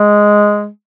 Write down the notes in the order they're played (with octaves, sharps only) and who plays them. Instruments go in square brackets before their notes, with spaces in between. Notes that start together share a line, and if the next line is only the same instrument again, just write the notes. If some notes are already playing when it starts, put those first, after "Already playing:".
Already playing: [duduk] G#3